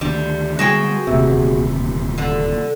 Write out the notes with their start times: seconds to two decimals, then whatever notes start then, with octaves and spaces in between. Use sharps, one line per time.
0.01 D2 D#3 G3 D4
0.59 D3 G3 G#3 F#4 G#4 G5
1.07 D#1 D2 C3
2.18 D3